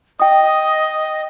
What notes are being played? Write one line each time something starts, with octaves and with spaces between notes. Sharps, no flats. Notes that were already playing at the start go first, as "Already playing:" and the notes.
D#5 G5 D#6